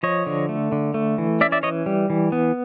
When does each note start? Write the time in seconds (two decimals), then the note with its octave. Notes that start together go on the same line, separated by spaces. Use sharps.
0.03 F3 C#5 D#5
0.26 D3
0.49 A3
0.72 D3
0.94 A3
1.18 E3
1.41 C#4 D5 E5
1.52 D5 E5
1.63 E3 C#5 D#5
1.86 G3
2.10 E3
2.32 B3